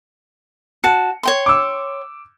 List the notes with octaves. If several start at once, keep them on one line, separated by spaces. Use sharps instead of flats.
F#4 A5 C#7
C#5 G5 C6
D6 E6